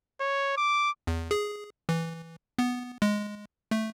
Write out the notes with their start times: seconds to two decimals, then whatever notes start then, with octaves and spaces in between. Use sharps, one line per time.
0.20 C#5
0.57 D6
1.07 E2
1.31 G#4
1.89 E3
2.58 B3
3.02 G#3
3.71 A3